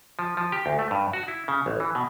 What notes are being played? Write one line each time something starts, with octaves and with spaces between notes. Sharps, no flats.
F3
F3
G4
D2
A3
G2
F#4
E4
C#3
A1
E3
B2